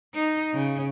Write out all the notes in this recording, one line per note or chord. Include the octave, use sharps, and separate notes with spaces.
D#4
C#3